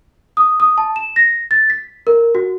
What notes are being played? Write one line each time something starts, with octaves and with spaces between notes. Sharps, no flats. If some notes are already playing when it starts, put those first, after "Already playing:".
D#6
D#6
A5
E7
A#6
A6
B6
A#4
F#4